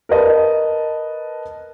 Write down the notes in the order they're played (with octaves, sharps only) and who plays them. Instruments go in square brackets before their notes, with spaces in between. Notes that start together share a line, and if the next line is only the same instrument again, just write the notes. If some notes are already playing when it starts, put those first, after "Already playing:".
[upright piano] A#4 B4 D#5 A5